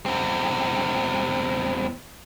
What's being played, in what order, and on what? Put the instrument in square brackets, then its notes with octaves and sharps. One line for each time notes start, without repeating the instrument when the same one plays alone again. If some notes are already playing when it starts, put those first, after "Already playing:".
[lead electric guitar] E2 C4